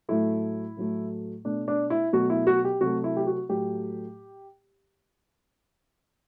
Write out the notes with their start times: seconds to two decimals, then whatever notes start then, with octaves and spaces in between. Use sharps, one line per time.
0.09 A2 F#3 A3 E4
0.77 A2 F#3 A3
1.45 B2 A3 D4
1.68 D4
1.90 E4
2.13 B2 F#3 A3 F#4
2.30 E4
2.47 F#4
2.65 G4
2.81 C3 F#3 A3 F#4
3.04 E4
3.16 G4
3.27 F#4
3.49 A2 F#3 A3 G4